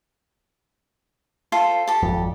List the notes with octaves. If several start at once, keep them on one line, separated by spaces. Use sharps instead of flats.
F4 A4 C5
G4 A4
G#1 F2